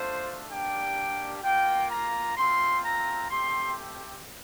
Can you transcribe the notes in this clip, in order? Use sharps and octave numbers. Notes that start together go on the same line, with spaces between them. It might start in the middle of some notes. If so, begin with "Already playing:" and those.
Already playing: A3 D4 F4 C5
G3 A#3 D4 G4 G5
A#3 F4 G5
A#5
A3 C4 F4 C6
A#5
A3 C4 G4 C6